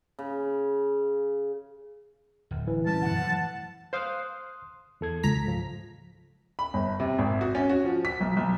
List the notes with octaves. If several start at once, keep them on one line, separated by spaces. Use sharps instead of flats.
C#3
D1
E3
G3 B3 C#4 A5
F#2 B2 D3 F#5
E3 F#3 A3
C5 F5 C6 D#6 F#6
E2 A4 G#6
C#2 A#5 B6
G#2 F3
B5
G1
C3
G#1
F#4
C#4
F#4
F3
B6
B1
B1